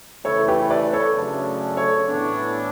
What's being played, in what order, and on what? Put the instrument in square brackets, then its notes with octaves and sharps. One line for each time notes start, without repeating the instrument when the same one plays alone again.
[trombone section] C#3 E3 A3 E4 [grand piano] A4 C#5
[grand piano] G4 B4
B4 D5
A4 C#5
[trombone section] F#2 C#3 F#3 A3 D4
[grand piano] A4 C#5
[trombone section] A2 E3 B3 D4